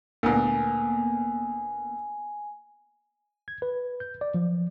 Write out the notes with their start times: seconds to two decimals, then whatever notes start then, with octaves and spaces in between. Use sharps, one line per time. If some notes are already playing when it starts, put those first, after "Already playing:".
0.23 D2 A#2 A#3 B3 G#5
3.48 G#6
3.62 B4
4.00 G6
4.21 D5
4.34 F3